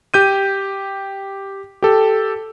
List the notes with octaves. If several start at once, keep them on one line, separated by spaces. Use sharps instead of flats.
G4 G6 D#7
G4 A4